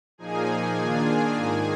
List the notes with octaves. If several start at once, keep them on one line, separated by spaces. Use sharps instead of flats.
A#2 F3 A#3 D#4 G#4 G#5
D#3 A#3 D4 F4
G#2 D#3 A#3